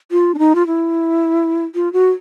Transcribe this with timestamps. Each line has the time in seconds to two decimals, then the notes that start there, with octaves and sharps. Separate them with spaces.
0.11 F4
0.34 D4
0.39 D#4
0.55 F4
0.67 E4
1.75 F4
1.93 F#4